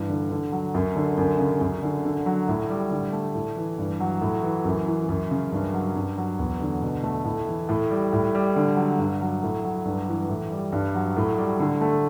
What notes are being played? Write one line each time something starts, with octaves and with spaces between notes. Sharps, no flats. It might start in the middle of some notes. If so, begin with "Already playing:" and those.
Already playing: G2 E3
D3
D3
F#3
F#2
D3
F#2
C#3
F#2
D3
D3
F#3
A2
G3
D3
A3
A2
E3
G2
F#3
A2
E3
F#2
E3
F#2
C#3
G2
F#3
G2
F#3
E2
D3
B2
A3
A2
E3
A2
G3
A2
G3
D3
F#3
G2
F#3
A2
F#3
G2
E3
A2
G3
G2
F#3
A2
G3
D3
A3